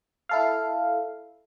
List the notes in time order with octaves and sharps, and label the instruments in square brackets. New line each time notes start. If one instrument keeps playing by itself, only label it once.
[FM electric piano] E4 A4 F5